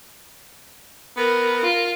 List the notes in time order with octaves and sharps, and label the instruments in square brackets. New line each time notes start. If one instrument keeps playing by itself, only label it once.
[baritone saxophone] B3 [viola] A#4
[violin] F4